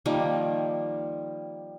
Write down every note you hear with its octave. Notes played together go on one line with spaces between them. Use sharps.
D#3 F3 G3 A#3